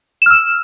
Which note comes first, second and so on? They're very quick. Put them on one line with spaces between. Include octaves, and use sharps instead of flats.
E7 F6 E6